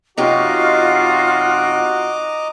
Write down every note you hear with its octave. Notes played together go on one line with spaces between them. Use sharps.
F#2 C3 D#4 F4 F#4 D#5 A#5 D6